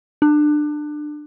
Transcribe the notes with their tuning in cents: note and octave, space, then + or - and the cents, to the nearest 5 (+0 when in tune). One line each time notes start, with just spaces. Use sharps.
D4 +25